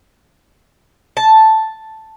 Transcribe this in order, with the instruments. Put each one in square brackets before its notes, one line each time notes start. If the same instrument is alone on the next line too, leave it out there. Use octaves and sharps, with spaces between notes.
[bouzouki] A5